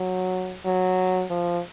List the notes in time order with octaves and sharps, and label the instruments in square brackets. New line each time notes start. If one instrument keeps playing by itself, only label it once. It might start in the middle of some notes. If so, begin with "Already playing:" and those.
Already playing: [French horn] F#3
F#3
F3